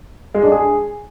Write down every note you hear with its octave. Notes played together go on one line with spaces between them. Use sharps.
G#3
D4
G#4